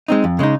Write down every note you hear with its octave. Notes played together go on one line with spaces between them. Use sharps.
G#3 C4 D#4
F2
C#3 G#3 D#4